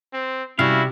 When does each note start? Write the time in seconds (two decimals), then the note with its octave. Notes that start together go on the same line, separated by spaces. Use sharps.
0.14 C4
0.59 C3 G3 C#4 E4 F#4 F5